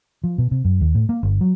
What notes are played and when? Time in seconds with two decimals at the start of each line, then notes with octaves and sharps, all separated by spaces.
0.24 F3
0.38 B2
0.51 C3
0.64 F#2
0.81 D#2
0.95 A2
1.09 A#3
1.23 G1
1.41 F#3